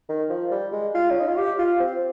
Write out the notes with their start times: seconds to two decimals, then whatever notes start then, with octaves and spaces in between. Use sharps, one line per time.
0.09 D#3
0.30 F3
0.52 G3
0.72 G#3
0.95 F4
1.11 C#4
1.20 D#4
1.27 F4
1.37 G4
1.58 F4
1.80 C4